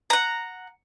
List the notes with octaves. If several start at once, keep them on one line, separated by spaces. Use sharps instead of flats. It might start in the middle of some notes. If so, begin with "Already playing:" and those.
F#5 A#5